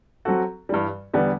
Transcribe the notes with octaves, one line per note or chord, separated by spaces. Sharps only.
F#3 C4 F#4 A4
G2 E3 G3
E2 D3 G3 B3